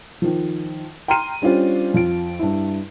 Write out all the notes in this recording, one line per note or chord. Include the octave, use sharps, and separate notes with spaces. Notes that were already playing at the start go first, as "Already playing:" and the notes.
D#3 F3
G5 A#5 C6 F6 D#7
G3 C#4 D4 F4 C5
F2 F4 D7
G2 E4